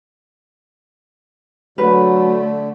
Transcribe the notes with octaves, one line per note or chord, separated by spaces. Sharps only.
D3 F#3 A3 B4